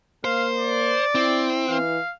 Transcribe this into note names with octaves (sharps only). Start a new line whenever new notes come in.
A#3 C5 F5
D5
C4 E4
E3 F5